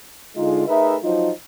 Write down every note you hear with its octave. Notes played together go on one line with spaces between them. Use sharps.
D3 G#3 D#4 F4
A3 D#4 G#4 A#4 B4 E5
F3 F#3 D#4 F4